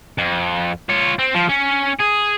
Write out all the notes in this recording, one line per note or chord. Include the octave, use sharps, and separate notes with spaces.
F2
F4 C#5
C4
F3
C#4
G#4